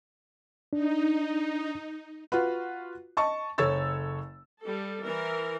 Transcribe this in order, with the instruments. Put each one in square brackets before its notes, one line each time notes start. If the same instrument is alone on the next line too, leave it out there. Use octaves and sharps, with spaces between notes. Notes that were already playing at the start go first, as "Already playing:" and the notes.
[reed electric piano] D4 [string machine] D#4
[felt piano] F4 F#4 B4
D#5 A5 C#6
F#1 A4 C#5 E6 A6
[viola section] G3 A4
E3 A#4